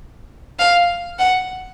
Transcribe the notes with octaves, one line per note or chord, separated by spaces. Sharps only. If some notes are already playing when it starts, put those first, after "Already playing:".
F5
F#5